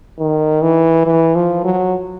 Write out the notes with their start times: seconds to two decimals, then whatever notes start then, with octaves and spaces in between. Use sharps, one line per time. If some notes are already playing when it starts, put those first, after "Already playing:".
0.19 D#3
0.62 E3
1.06 E3
1.35 F3
1.64 F#3